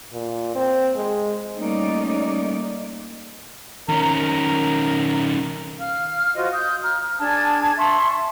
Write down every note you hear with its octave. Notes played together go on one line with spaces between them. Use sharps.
A#2
C4
G#3
G3 A3 A#3 C#4 D#4 D5
D#3 C#4 A#4
F5 F6
F4 F#4 C5 D#5
D#6 G6
A#5 F6
D4 G#4 A5 G#6
E5 A5 C6 C#6